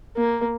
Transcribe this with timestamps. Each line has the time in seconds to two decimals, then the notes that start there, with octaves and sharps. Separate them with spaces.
0.17 A#3